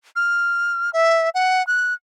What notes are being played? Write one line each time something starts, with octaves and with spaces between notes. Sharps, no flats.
F6
E5
F#5
F#6